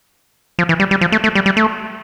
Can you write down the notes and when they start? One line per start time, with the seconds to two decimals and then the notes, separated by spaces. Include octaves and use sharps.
0.59 F3
0.69 E3
0.80 G3
0.91 G3
1.01 F3
1.12 A3
1.24 A3
1.35 G3
1.46 G3
1.57 A3